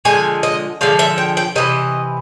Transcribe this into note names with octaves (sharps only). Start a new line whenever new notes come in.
D3 F3 G#3 G#5
D#5
D3 F3 G#3 F5
E5
G5
G5
C3 E3 D#5